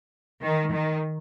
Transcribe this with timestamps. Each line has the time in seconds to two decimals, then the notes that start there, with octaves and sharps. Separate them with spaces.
0.42 D#3
0.73 D#3